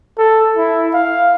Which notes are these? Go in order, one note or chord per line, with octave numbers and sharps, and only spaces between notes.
A4
E4
F5